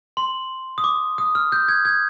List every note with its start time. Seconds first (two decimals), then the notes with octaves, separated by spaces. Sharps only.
0.17 C6
0.78 D#6
0.84 D6
1.18 D#6
1.35 F6
1.52 G6
1.68 G#6
1.85 G#6